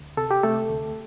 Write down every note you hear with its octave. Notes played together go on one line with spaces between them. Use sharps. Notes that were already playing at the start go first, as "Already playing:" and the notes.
Already playing: D2
C3 A4
G4
C3 A3 A4
D2